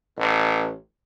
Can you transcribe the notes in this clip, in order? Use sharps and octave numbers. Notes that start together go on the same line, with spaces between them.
A1